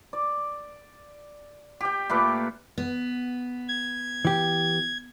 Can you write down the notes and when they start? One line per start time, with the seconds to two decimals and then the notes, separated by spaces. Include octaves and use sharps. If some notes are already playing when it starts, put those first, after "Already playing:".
0.13 D5
1.81 G4 G5
2.10 A#2 A3 B4 D6
2.78 B3
3.69 G#6
4.25 E3 G4